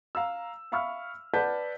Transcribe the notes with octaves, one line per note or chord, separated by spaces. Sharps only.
F5 A#5 E6
E5 F5 B5 C#6 E6 F6
B4 D5 F#5 A5 G6 B6